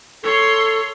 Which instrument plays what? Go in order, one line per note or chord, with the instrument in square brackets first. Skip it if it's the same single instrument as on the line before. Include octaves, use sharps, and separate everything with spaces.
[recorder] A4 [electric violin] C#5 C6